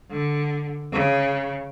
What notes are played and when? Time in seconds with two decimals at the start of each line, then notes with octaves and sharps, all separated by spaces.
0.11 D3
0.93 C#3